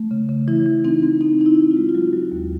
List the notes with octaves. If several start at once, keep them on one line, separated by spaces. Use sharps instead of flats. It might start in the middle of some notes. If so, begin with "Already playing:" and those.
Already playing: A3
C#3
C#3
E3 E4
E3
C4 D#4
C4
C4 D#4
C4 D#4
E4
C4
F4
G#3
F4
F#3 F#4
F#3
D#2